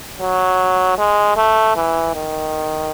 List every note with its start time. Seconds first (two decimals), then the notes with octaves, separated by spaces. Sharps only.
0.20 F#3
0.98 G#3
1.37 A3
1.76 E3
2.15 D#3